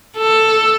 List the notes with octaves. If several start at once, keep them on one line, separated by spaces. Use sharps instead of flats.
A4